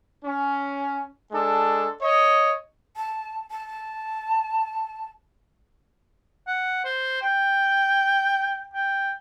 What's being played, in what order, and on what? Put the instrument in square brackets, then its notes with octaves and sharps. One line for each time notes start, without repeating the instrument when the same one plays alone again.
[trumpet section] C#4
G#3 D4 A4
C#5 D#5
[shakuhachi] A5
A5
[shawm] F#5
C5
G5
G5